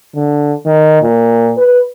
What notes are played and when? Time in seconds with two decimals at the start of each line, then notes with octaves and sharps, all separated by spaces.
0.15 D3
0.66 D#3
1.02 A#2
1.57 B4